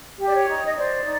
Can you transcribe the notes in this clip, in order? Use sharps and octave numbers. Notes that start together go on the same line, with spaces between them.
G4
D5
C#5
D#4
D#5
C5 D5
D#4